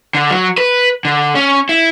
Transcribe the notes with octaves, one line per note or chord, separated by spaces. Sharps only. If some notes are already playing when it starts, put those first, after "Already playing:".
D3
F#3
B4
D3
C#4
E4